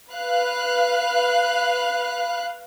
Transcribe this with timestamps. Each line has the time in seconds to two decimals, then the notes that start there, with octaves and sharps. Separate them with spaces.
0.11 B4 F5 F#6